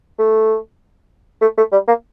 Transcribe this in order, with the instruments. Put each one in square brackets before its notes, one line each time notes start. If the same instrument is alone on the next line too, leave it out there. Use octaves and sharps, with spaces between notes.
[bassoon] A3
A3
A3
G3
A#3